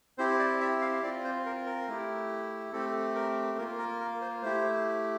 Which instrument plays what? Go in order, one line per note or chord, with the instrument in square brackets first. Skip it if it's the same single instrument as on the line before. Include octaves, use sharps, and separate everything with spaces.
[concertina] C4 E4 G4 C5
D5
E5
F5
C4 F4 D5
C5
A#4
A#4
A3 E4 G4
A3 C4 G4 A4
A#4
A#3 F4 A#4
A#4
A#4
C5
A3 E4 G4 C5